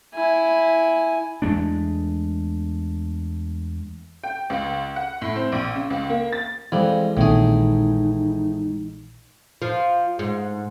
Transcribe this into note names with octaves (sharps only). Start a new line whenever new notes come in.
E4 G#5
E2 G#3 A3 D4
G5
C#2
F#5
A2
C4
A#1
C#3
C#2
A#3
A6
F2 E3 G3 G#3
A#1 A2 D#3 C4 D#4 G#4
F3
G#2